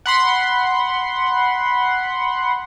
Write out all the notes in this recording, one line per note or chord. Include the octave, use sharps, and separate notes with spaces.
F#5 B5 C6